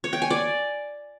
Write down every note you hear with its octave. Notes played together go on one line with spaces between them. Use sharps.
C#5
G5
G#5
D5